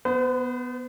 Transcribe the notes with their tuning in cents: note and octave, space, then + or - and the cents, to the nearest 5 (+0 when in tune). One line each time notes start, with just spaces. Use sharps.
B3 +0 C5 -45